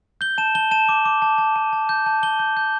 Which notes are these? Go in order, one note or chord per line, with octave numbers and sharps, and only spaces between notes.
G6 G7
A5 E7
A5 G7
A5 E7
D6
D6
A5
A5
A5
A5
G6
A5
A5 G7
G6
G6